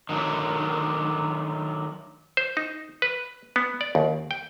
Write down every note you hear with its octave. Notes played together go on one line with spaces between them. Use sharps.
D#3 F#3 A3 D4
C5
D#4
B4
B3
D5
D#2
G5